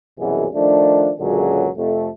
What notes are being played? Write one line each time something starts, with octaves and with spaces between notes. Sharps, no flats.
C2 F#2 B2 E3 G#4
D#3 F3 A3 D4
C#2 F#2 A#2 D3 F#3 G#4
F2 C3 A3